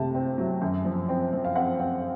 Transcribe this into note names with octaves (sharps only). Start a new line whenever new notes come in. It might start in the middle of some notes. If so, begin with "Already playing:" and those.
Already playing: C3 A3 A5
C4
F#3
F#2
F3
C4
F3
F5
C4 F#5
C4